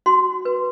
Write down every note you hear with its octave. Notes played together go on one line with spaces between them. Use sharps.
F#4 C6
B4